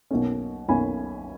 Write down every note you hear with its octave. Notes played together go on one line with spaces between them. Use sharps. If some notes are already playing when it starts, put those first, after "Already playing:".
B1 B2 A#3 C#4
B1 B2 A#3 C#4 G#5 B5